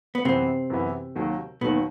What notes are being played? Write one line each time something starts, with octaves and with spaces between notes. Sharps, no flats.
B3
F#2 C3 E3 B3 C4 E4
F#2 E3 B3 E4
D#2 D#3 F#3
D#2 B2 D#3 F#3 B3